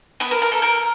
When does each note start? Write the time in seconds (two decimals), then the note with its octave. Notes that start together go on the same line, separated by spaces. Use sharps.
0.20 B3 B4
0.31 A#4
0.42 A#4
0.52 A4
0.62 A#4